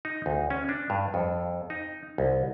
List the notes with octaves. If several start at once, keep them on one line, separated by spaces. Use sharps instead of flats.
D#4
D2
C#4
D4
G2
F2
D#4
C2